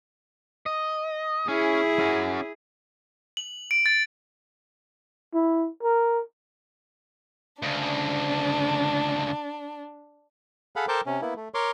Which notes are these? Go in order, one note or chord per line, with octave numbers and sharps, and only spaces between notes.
D#5
C#4 E4 G#4
C#4 F#4
F#7
D7
A6
E4
A#4
D2 C#3 D4
G#4 A4 F5 F#5 B5
A4 A#4 C5 G5 A5 D6
C3 C#4
A#3 B3 E4
A3
A#4 C#5 C6 D6